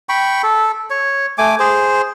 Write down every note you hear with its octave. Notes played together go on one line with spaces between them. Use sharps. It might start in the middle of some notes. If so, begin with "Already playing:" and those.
G5 B5 C#6
A4
C#5
A3 G#5 D6
G#4 C5